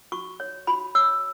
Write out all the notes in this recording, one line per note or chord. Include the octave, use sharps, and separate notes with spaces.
F#4 C#6
C#5
F#4 B5
C#5 E6